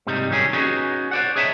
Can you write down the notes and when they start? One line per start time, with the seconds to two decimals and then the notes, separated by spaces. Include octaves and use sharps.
0.07 G#2 C3 G3 D#4
0.29 C2 D#3 F#3 G3 C#4 G#4
0.53 B3 C#4 D#4 F#4 G#4
1.11 C5 D5 F#5
1.36 G#4 C#5 D#5 E5 G5 A5